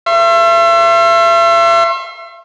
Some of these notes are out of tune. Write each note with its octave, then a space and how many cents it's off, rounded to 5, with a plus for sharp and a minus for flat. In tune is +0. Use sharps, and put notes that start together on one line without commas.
E5 +40 C6 +40